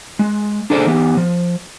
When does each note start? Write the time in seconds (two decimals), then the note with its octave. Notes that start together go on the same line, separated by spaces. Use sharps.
0.19 G#3
0.70 D4 G#4 A4 C5 D5
0.86 E3 B3 G4
1.17 F3